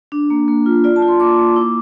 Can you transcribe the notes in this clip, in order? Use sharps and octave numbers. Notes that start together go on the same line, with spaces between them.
D4
A#3
A#3
F4
F4 D5
A5
F4
C6
A#3 D6
A#3
E4 D6